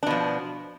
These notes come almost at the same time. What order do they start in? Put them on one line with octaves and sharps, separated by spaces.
D4 B2 F3